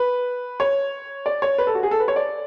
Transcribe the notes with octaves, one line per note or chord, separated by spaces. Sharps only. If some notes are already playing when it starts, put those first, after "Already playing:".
Already playing: B4
C#5
D5
C#5
B4
A4
F#4
G#4
A4
B4
C#5
D5